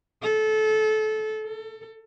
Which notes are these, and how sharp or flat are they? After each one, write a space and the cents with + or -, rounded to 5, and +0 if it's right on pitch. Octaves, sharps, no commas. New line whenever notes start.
A4 -25
A4 +25